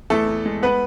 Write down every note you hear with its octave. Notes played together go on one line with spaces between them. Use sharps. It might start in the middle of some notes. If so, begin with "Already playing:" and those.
E2 A3 A4
E2
G#3
B3 B4